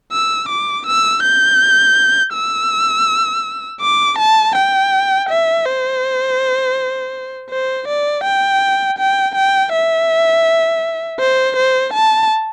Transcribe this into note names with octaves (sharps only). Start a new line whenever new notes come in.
E6
D6
E6
G6
E6
D6
A5
G5
E5
C5
C5
D5
G5
G5
G5
E5
C5
C5
A5